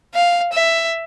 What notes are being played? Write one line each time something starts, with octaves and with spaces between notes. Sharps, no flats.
F5
E5